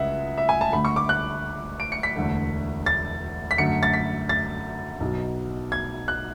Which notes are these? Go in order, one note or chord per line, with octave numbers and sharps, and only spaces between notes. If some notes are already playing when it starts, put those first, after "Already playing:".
Already playing: C#2 C#3 G#3 E5 F#5
E5
G#5
A5
D2 D3 A3 B5
C#6
D6
F#6
D7
C#7
B6
E1 D2 D3 A3
A6
B6
F#2 D3 A3 C#7
A6
B6
A6
B1 B2 F#3
G#6
F#6